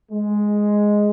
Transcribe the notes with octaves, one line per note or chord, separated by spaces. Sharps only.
G#3